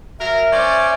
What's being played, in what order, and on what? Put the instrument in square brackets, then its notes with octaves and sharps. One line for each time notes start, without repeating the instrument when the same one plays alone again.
[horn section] F#3 A#4 [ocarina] E5
[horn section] C#4 C5 D5